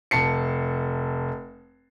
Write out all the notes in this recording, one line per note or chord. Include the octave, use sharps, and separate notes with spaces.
F1 A5 C7 C#7